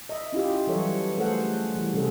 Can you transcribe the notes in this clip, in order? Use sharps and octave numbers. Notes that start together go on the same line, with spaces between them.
D#5 E5
C#4 E4 F4 G4
E3 F#3 G3 A4 B4 C#5
A3 G#4 A4 C5 F#5
E3 G3
C3 C#4 G#4 A4